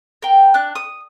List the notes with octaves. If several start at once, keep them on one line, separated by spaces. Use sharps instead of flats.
A#4 G5
D4 F#6
D#6